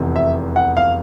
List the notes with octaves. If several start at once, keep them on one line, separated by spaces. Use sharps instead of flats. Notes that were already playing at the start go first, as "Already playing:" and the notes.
Already playing: F1 E2 C3
E5
F#5
F5